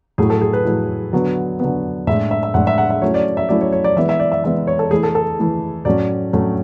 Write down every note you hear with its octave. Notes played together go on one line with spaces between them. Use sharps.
A2 F#3 A3 E4 G#4
A4
G#4
B4
A2 F#3 A3 E4
D3 F#3 B3
D3 F#3 B3
A2 G#3 D4 E5
E5
E5
A2 G#3 D4 F#5
E5
F#5
E5
F#3 A3 C#4 E4 C#5
D5
E5
F#3 A3 C#4 E4 D5
C#5
C#5
D5
E3 G#3 B3 E5
E5
D5
E5
E3 G#3 B3 E5
C#5
A4
E3 A3 E4 G#4
A4
A4
E3 A3 E4
A2 F#3 A3 C#4 D5
A2 F#3 A3 C#4